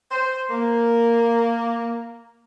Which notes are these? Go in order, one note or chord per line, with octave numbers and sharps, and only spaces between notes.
C5
A#3